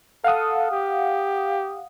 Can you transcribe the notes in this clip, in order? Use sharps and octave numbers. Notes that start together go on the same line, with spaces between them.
A4 F5 F#5 D#6
G4